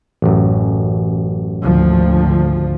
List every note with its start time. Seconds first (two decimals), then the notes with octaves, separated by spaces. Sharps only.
0.22 A1 F#2
1.62 G#1 D2 F3